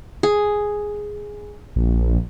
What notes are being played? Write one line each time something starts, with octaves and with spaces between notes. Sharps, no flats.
G#4
A#1